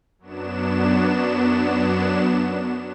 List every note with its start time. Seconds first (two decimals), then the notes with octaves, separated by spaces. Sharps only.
0.19 F#2 F#3 B3 D4 E7